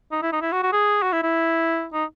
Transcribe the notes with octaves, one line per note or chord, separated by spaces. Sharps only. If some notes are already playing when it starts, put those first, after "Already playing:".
D#4
E4
D#4
E4
F#4
F#4
G#4
F#4
E4
E4
D#4